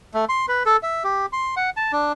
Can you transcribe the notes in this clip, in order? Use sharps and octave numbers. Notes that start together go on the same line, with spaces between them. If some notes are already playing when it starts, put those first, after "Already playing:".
A3
C6
B4
A4
E5
G4
C6
F#5
A5
D4